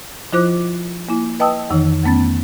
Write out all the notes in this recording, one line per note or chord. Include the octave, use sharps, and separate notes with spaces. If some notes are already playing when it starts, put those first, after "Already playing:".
F3 E4 F4 C5 D6 F#6
A#3 E4
B4 D#5 G5 A5 D#6 E6
F2 D#3 E3 D#4
F2 A3 B3 C#4 A6